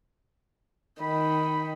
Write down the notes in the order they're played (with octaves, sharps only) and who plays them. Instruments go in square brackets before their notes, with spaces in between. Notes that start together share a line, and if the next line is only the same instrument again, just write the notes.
[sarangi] D#3 [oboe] B5